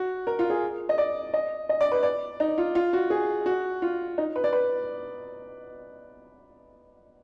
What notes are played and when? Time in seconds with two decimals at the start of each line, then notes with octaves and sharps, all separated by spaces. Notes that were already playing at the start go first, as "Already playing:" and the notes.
Already playing: F#4
0.27 A#4
0.39 F4
0.50 G#4
0.89 D#5
0.98 D5
1.34 D#5
1.69 D#5
1.81 D5
1.92 B4
2.03 D5
2.40 D#4
2.58 F4
2.75 F4
2.93 F#4
3.10 G#4
3.46 F#4
3.82 F4
4.18 D#4
4.36 B4
4.44 D5
4.53 B4